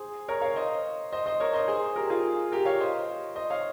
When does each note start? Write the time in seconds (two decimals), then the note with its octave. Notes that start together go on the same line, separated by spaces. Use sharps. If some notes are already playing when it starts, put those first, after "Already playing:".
Already playing: G#4 C5
0.28 A#4 C#5
0.41 C#5 F5
0.56 C5 D#5
1.12 C5 D#5
1.26 C5 D#5
1.40 A#4 C#5
1.53 C5 D#5
1.68 G#4 C5
1.96 G4 A#4
2.10 F4 G#4
2.52 G4 A#4
2.65 C#5 F5
2.80 C5 D#5
3.35 C5 D#5
3.50 C#5 F5